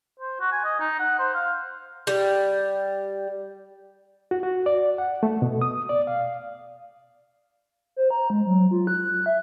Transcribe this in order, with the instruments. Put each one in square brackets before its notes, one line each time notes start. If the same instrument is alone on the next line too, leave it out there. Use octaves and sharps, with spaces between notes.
[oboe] C5
F#4
G#5
D#5
D#4
F#5
C5
F5
[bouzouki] G3
[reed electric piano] F#4
F#4
D5
F#5
A3
B2
D#6
D5
F5
[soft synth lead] C5
A#5
G#3
F#3
F4
F#6
F#6
E5